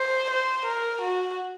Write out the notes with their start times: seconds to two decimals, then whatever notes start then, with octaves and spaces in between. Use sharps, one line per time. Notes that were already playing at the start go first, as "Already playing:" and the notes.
Already playing: C5
0.31 C5
0.65 A#4
1.02 F#4